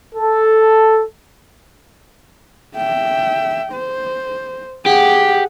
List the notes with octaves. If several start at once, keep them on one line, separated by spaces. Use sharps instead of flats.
A4
E5 G5
C5
G4 G#4 F#5